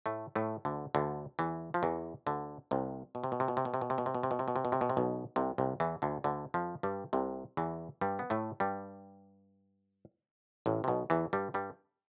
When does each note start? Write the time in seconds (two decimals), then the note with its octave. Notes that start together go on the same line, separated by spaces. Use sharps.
0.06 A2 A3
0.35 A2 A3
0.65 D2 D3
0.95 D2 D3
1.39 E2 E3
1.74 F3
1.83 E2 E3
2.26 D2 D3
2.71 C2 C3
3.15 B2
3.24 C3
3.32 B2
3.40 C3
3.48 B2
3.57 C3
3.65 B2
3.74 C3
3.81 B2
3.90 C3
3.98 B2
4.06 C3
4.15 B2
4.23 C3
4.31 B2
4.39 C3
4.48 B2
4.56 C3
4.65 B2
4.72 C3
4.81 B2
4.90 C3
4.97 B1 B2
5.36 C2 C3
5.58 C2 C3
5.80 E2 E3
6.02 D2 D3
6.24 D2 D3
6.54 F2 F3
6.83 G2 G3
7.13 C2 C3
7.57 E2 E3
8.01 G2 G3
8.19 B3
8.30 A2 A3
8.60 G2 G3
10.66 A1 A2
10.84 C3
10.88 B1 B2
11.10 E2 E3
11.33 G2 G3
11.54 G2 G3